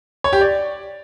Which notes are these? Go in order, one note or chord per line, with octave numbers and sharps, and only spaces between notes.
C#5
G4
D5